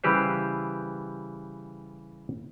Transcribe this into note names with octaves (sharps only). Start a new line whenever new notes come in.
C#3 E3 G3 G4 B4 C5